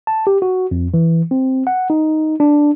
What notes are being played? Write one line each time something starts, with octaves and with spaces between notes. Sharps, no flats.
A5
G4
F#4
F2
E3
C4
F#5
D#4
D4